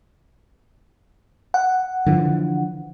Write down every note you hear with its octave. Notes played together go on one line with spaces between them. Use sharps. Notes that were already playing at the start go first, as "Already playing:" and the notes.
F#5
D3 E3 F3